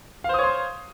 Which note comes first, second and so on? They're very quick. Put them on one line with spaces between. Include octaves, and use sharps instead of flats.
F5 C5 D#6 C#5 C6